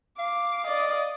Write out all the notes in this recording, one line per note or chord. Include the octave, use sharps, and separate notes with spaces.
F5 D6
D5 D#5